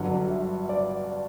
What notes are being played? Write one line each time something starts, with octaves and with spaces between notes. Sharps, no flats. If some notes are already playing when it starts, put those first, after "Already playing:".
Already playing: G1 G2 D3 F#3 F#5
E5
D5